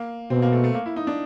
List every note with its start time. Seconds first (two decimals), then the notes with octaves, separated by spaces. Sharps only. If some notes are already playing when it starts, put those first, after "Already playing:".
Already playing: A#3
0.30 B2 C4
0.42 A#3
0.52 A3
0.64 A3
0.74 A#3
0.86 E4
0.96 D#4
1.07 D4